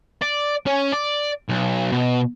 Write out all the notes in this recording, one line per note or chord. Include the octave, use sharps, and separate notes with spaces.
D5
C#4
D5
B1
B2